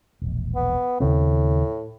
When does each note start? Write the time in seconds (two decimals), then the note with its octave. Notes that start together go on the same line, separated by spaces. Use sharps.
0.22 E1 A#1
0.55 B3
1.00 D#2 A2 C#3 C4